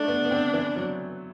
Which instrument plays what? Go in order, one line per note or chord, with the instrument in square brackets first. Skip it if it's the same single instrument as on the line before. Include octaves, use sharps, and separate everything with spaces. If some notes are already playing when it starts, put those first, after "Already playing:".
Already playing: [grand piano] A3 [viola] D4
[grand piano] B3
B3
C4
E3
F#3